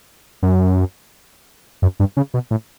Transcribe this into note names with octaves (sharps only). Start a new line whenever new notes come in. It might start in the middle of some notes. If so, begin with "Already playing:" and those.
F#2
F#2
G2
C#3
B2
A2